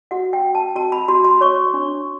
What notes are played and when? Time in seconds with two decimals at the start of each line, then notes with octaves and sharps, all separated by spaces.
0.11 F#4 F#5
0.33 G5
0.43 F#4
0.55 A5
0.76 F#4 A#5
0.92 B5
1.08 F#4 C6
1.24 C6
1.41 C#5 C#6
1.74 D4